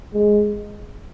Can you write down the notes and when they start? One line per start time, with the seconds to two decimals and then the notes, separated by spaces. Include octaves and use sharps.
0.13 G#3